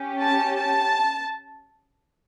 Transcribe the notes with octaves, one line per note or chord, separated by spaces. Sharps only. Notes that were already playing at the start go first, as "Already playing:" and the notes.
Already playing: C#4 G4
A5
A5